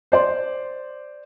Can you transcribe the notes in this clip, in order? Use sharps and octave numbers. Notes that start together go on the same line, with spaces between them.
C5 D5 C6